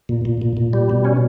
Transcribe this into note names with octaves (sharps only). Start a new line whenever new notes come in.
A#2
A#2
A#2
A#2
G3
B2
C#4